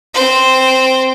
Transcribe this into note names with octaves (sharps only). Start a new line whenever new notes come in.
C4 C5